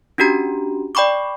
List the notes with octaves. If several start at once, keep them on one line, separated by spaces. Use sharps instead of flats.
C#4 D4 F#4 G4 A#5
D5 G5 B5 C#6 D6